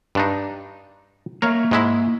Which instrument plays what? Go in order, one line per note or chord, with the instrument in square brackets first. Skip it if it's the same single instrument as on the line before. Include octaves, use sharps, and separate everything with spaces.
[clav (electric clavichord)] G2 D4 D#4
[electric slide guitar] A#3 E5 [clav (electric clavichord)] A#4 C#5 F5
[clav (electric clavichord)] G#2 G#3 E4